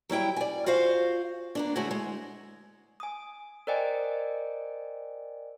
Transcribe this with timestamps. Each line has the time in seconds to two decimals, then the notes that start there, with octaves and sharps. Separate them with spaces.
0.09 F#3 G3 E4 G5
0.36 D5 G#5
0.66 F4 F#4 C5 F5
1.55 A#3 B3 D4
1.76 D3 G#3 A3 C#4 E4 F#4
1.91 G#3
3.00 G#5 D#6
3.67 A#4 C5 D5 D#5 G5 G#5